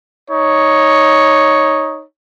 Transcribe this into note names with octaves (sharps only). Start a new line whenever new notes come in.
D#4 C#5